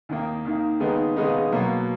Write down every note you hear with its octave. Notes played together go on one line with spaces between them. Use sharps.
D#2 D#3 A#3
D#2 D#3 A#3
D#2 C#3 G#3 B3 D#4
D#2 C#3 G#3 B3 D#4
B2 F#3 A#3